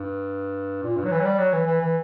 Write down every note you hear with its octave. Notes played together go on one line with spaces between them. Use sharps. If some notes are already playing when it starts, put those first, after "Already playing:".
Already playing: G2
A#2
G2
F#3
E3
F#3
G3
F#3
E3
E3
E3